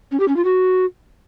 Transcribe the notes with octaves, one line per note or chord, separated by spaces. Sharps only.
C#4
G4
C#4
F4
F#4